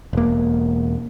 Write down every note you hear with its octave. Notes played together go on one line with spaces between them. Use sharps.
E1 A#3